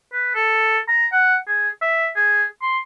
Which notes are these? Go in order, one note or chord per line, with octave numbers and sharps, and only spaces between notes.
B4
A4
A#5
F#5
G#4
E5
G#4
C6